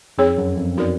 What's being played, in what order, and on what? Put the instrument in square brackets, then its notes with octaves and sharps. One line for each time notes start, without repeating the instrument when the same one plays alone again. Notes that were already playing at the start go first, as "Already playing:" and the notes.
[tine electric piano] F2 [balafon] C4 D#4 G#4 C#5
[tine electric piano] F#2
F2
[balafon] B3 D#4 F#4 A#4 D5